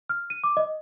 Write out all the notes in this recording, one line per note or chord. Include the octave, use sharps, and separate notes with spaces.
F6
D#7
D6
D#5